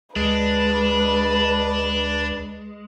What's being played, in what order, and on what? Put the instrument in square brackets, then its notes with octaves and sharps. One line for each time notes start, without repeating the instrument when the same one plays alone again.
[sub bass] D2 [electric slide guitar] G#3 [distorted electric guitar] D4 [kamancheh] B4